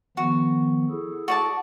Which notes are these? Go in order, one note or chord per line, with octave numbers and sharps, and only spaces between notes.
D#3 F3 B3 F#4
E4 G#4 A4
F#4 D5 A5